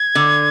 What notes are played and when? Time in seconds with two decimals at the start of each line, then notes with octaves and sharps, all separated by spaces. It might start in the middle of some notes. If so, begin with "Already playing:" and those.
Already playing: G#6
0.15 D3